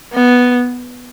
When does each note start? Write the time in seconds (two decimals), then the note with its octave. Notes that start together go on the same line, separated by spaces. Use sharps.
0.14 B3